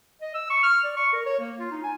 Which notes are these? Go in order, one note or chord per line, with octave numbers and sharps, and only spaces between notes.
D#5
E6
C#6
F6
D5
C#6
A#4
C#5
A#3
F4
D#4
G#5